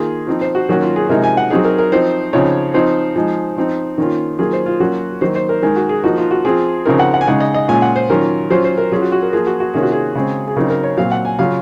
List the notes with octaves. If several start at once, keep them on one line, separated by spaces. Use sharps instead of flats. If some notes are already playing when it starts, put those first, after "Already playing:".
Already playing: D#3 A#3 F4 G#4
F3 C4 D#4
C5
F#4
D#3 F#3 A#3 C#4 F#4
F4
G#4
C3 F3 G#3 D#4 A#4
G#5
F#5
F#3 C4 D#4 G#4
A#4
A#4
F3 C4 D#4 C5
C#3 F3 C4 D#4 C#5
F3 C4 D#4 C5
F3 G#3 D#4
F3 C4 D#4
D#3 A#3 C#4 F4
D#3 F#3 A#3 F4 G#4
C5
F4
F#3 A#3 C#4 F4 F#4
D#3 F#3 A#3 D#4 C5
C5
A#4
D#3 G#3 D#4 A#4
F#4
G#4
F3 A#3 D#4 F#4
F4
F#4
F3 C4 F4 G#4
C#3 F3 C4 D#4 A#4
F#5
F#5
G#5
C#3 G#3 D#4 F#5
D#5
D#5
A#2 G#3 C#4 F4 G#5
F#5
C5
D#3 F#3 C#4 F4 A#4
F#3 C#4 F4 C5
C5
A#4
F#3 C#4 F4 G#4
F#4
F#4
A#4
F3 A#3 F4 G#4
F#4
F#4
C3 D#3 A#3 C#4 F4 G#4
F#4
G#4
C#3 G#3 C4
G#4
C#3 F#3 C4 D#4 A#4
A#4
C#5
A#2 F#3 C4 F5
F#5
G#5
C#3 F#3 C#4 F4 F5